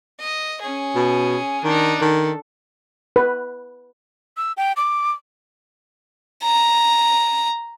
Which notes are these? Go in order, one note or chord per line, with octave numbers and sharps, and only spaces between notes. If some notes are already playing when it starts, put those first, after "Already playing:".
D#5
C#4 G#4
B2
D#3 D4 D#4
D#3 A4
B4
E6
G5
D6
A#5